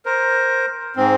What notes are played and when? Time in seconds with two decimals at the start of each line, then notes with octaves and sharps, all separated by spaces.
0.06 A#4 C5
0.96 G#2 C4